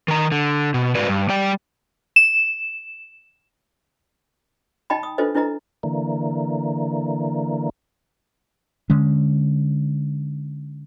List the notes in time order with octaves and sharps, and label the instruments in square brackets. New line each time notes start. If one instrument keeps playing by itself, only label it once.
[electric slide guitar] D#3 A#5
D3
B2
G#2 F#4 B4 D5
G2
G3 D5 G5
[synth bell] E7
[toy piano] D#4 D#5 G5 A5 B5
D#6
D4 F4 A4 B4 C5 D#5
D4 E4 B4 D#5 A#5
[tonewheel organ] D3 E3 A#3
[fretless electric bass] D3 G#3 C#4